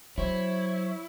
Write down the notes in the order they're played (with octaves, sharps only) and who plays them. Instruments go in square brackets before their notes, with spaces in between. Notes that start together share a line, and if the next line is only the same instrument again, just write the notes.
[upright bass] F#3 [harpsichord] C4 [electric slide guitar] E4 [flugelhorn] C#5